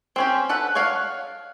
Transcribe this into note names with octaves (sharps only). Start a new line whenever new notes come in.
C4 C#4 G4
A4 B4 F#5
C#5 D5 F5 F#5